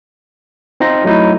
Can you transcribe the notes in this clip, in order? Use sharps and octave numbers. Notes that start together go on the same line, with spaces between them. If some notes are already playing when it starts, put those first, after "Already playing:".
C4 D#4 F4 A#6
F#3 A3 D#4 E4